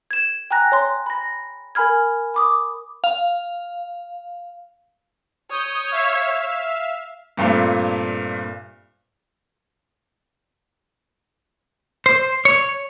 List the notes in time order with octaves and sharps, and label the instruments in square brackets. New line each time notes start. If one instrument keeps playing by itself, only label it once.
[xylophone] G#6 E7
G5 G#5 A#5 F#6 A#6
C#5 C6
B5 A#6
A#4 G#5 B5 F6 G#6
B5 D6 D#6
[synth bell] F5
[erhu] C#5 [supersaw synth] D#6 G6
[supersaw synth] E5 F5
[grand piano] G2 A#2 A3 C4 F4
[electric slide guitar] C5
C#5